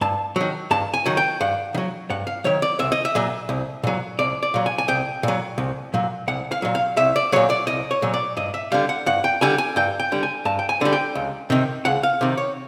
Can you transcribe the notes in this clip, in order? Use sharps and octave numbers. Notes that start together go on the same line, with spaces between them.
G2 A5
D#3 F#3
G2 A5
G#5
D#3 F#3
G5
G2 F#5
D#3
F#3
G2 F#5
F5
D#3 F#3 C#5
D5
C2 E5
D#5
E5
A#2 F#3
C2
A#2 F#3
C2 D5
D5
A#2 F#3
G#5
G#5
C2 G5
A#2 F#3
C2
A#2 F#3
C2 F#5
F5
A#2 F#3
F5
C2 E5
D5
A#2 F#3 C#5
D5
C2 D#5
C#5
A#2 F#3
D5
G2 D#5
E5
D3 G3 F5
F#5
G2 F#5
G5
D3 G3 G#5
G#5
G2 G5
G5
D3 G3
G#5
G2 A5
G5
G#5
D3 G3
G5
C#2
C3 D#3
C#2 F#5
F5
C3 D#3
C#5